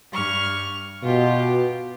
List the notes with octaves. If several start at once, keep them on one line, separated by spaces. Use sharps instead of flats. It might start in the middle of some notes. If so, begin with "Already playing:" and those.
G2 C#6 F6
B2 F4 G4